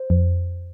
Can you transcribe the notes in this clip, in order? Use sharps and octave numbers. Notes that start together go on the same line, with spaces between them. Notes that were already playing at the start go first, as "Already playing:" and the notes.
Already playing: C5
F2